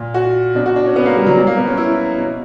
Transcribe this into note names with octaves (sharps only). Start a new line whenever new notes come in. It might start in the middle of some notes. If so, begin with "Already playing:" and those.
Already playing: A#2
F#4
B2 D4
F#4
D4
C#4
B3
A#3
G3
F#3
B2 G3
A#3
B3
C#4
E4
B2